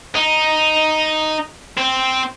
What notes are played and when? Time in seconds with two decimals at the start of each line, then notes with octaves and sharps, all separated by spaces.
0.15 D#4
1.78 C4